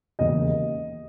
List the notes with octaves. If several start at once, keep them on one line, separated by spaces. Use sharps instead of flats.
E1 D#2 C#3 D#5